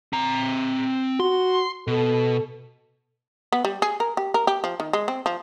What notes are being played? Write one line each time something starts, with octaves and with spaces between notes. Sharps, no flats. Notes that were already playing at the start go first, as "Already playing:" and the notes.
C4 A#5
F#4 C6
B2 A4
B3
G3
G#4
A#4
G4
A#4
G4
F3
D#3
G#3
C4
F3